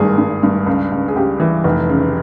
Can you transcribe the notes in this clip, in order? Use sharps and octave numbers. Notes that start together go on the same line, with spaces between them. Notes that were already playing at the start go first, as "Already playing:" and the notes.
Already playing: G#1 G2 G#4
G2
G2
C#2
C#2
G#4
C#2 G4
E3
F1
C#3